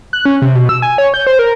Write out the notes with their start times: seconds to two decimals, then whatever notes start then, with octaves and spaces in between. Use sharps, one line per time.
0.13 F#6
0.25 C#4
0.42 C3
0.55 B2
0.69 E6
0.82 G#5
0.98 C#5
1.14 G6
1.27 C5
1.39 A#4